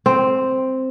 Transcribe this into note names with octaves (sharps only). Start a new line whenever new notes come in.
C4